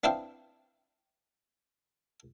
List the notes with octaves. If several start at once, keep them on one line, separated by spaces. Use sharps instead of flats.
B3 C4 D4 E4 F5 G5